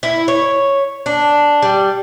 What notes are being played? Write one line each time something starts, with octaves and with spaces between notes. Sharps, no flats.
E4
C#5
D4
G3